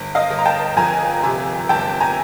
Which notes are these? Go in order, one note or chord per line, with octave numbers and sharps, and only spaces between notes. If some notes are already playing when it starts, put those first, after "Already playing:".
Already playing: G1
D#5 F5
G1
A#5
G5 A5
F2 G#5 A#5
C3
G1 G5 A5
G#5 A#5